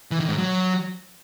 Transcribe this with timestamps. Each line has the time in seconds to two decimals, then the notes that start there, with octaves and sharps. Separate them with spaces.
0.11 E3
0.20 D#3
0.29 G#2
0.38 F#3